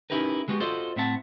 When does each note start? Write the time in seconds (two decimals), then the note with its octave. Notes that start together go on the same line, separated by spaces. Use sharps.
0.10 C#4 D#4 E4 G4 A#4 B4
0.48 D3 G#3 B3 F#4 G4
0.60 F4 F#4 A4 C5 D5 D#5
0.96 A2 C4 E5 F#5 A5